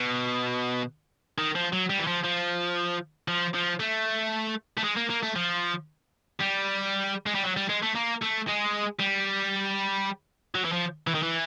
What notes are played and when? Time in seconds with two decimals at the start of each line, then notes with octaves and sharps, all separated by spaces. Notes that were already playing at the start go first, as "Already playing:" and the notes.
Already playing: B2
1.38 D#3
1.55 F3
1.72 F#3
1.90 G3
1.99 E3
2.07 F3
2.24 F3
3.28 F3
3.54 F3
3.80 A3
4.78 A3
4.84 G#3
4.97 A#3
5.10 A#3
5.23 A3
5.36 F3
6.40 G3
7.26 G#3
7.35 G3
7.43 F#3
7.57 G3
7.69 G#3
7.83 A3
7.95 A#3
8.22 A3
8.48 G#3
8.99 G3
10.55 F#3
10.65 E3
10.73 F3
11.07 E3
11.14 D#3
11.23 E3